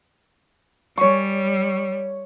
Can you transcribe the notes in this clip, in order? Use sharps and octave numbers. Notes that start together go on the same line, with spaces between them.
G3 C#5 C#6